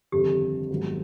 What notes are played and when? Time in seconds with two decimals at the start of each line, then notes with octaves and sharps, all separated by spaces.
0.12 G1 F2 C3 D#3 G4
0.70 G#1 G#2 D#3 F#3 B3